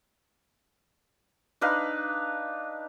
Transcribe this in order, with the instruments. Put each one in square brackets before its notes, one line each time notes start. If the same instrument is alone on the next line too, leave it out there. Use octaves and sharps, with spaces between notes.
[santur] D4 D#4 B4 F5